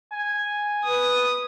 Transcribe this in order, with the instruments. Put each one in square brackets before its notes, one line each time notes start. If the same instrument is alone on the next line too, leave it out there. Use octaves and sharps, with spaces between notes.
[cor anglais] G#5
[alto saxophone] B4 [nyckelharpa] D#6